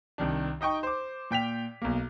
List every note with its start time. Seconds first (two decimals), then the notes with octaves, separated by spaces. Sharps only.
0.18 C2 D#3 D4
0.61 D#4 D#5 G5 C#6
0.83 C5 D6
1.31 A#2 G5 B6 F7
1.82 B1 A#3